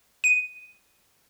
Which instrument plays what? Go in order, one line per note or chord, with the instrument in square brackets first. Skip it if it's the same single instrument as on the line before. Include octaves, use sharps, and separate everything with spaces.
[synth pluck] D#7